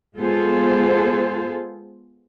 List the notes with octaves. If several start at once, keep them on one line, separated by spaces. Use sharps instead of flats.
G#3 B3 F4 G#4 A4 C5